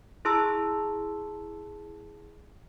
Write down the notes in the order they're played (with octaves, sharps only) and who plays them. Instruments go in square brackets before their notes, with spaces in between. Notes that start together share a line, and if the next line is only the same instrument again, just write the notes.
[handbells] E4 G#4 A5 A#5 C6 E6